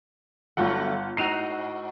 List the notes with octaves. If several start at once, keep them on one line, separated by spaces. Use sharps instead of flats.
G1 D3 F#3 A3 F4 F#5
G#2 D#4 F#4 C7 D#7 F7